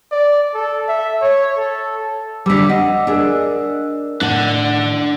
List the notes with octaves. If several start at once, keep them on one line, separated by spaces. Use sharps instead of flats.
D5
A4
E5
C#5
A4
D3 G3 D6 E6 B6
D#5 F#5
D4 G#4 A#4 D#5 E6
A2 D4 F#5